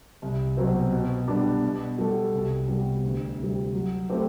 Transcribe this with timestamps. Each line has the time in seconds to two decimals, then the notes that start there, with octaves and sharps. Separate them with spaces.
0.22 C2
0.57 B2 F#3 C4
0.92 B2
1.28 G3 B3 D4
1.62 B2
1.98 G3 B3 F#4 A4
2.33 C2
2.67 C3 G3 B3 F#4
3.04 D2
3.38 C3
3.43 G3
3.73 F#3
4.09 A3 C4 E4 G4